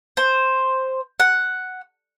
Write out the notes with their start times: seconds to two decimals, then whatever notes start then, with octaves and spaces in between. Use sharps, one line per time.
0.17 C5
1.20 F#5